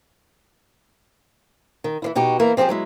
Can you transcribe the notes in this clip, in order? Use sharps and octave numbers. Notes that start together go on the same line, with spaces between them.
D#3
E3 F3 E4
B2 D#4 F#4 G4
E3 A#3 E4 A#4
F3 C4 F4 G4 G#4
F#3 G#3 E4